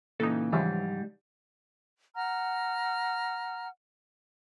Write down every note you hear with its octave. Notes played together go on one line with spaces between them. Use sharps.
A#2 C#3 E3 D#4 A4
G#2 C#3 E3 F3 G3
F#5 A#5 F6